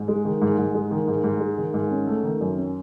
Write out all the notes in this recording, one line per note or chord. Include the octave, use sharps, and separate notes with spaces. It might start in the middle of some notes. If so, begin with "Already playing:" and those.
Already playing: G#2
G#3
D#3
G#2
G#2
G#3
D#3
G#2
G#2
G#3
D#3
G#2
C#4
A3
D#3
F#2
C#4